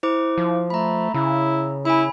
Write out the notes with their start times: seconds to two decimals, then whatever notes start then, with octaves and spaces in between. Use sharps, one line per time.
0.03 E4 C5 D6
0.38 F3
0.70 A3 A#5 B5
1.14 C#3 E4
1.85 E4 G#5 B5